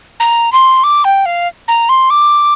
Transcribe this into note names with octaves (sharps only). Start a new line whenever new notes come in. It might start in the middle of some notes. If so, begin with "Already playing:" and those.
A#5
C6
D6
G5
F5
A#5
C6
D6